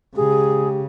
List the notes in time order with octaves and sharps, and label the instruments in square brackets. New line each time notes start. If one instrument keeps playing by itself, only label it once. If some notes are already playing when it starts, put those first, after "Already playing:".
[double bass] C#3 [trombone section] G#3 G4 [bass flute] G#4